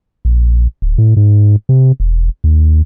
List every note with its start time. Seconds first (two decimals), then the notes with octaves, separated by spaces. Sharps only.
0.25 A#1
0.82 D1
0.98 A2
1.17 G#2
1.69 C3
2.00 E1
2.44 D#2